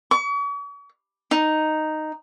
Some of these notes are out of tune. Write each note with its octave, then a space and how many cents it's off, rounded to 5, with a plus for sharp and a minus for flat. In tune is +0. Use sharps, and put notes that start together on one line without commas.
C#6 +45
D#4 -5